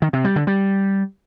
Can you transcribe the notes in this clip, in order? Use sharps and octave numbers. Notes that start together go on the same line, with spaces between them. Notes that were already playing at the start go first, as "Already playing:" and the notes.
D#3
C3
G3
D3
G3